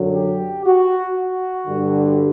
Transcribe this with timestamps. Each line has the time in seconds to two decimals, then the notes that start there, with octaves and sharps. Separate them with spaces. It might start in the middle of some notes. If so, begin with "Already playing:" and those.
Already playing: F#2 D3 F#3
0.14 G4
0.65 F#4
1.17 F#4
1.67 G2 D3 G3